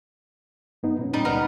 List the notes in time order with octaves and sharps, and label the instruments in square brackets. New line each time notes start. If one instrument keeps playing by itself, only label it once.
[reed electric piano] F#2 B3 D#4
A#2 B3 C#4
[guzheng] G3 D#4
[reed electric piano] C#2 B4 D5 [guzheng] B3 A#4